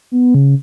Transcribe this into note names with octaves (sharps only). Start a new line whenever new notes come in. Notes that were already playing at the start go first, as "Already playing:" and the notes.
B3
C#3